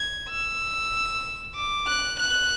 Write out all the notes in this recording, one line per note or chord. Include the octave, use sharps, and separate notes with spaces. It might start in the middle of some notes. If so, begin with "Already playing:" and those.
Already playing: G#6
E6
D6
F#6
F#6